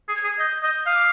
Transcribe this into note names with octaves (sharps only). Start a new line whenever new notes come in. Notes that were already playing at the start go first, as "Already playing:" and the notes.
G#4
G#6
G#4
D#5 G6
D#5 G6
F5 D#6
D6